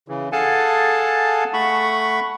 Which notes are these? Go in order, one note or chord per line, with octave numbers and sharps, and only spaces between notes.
C#3 E3
G#4 A4 F5 F#5 G#5 A5
A3 F#5 B5 C#6